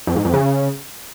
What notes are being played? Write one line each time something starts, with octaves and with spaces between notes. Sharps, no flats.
F2
G#2
F2
C#3